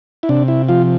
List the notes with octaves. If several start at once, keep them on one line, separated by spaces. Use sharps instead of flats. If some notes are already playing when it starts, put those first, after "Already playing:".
E4
C3 D4
E4
F3 F4